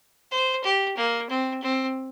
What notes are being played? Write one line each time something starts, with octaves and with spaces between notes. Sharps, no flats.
C5
G4
A#3
C4
C4